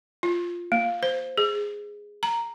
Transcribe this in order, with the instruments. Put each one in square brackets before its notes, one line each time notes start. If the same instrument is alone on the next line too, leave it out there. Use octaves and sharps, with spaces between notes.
[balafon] F4
A#3
C5
G#4
A#5